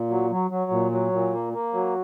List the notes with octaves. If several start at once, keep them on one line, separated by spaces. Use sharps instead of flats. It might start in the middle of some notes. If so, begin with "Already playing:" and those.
Already playing: A#2
F#3
F#3
F#3
A#2
F#3
A#2
A#3
A#3
F#3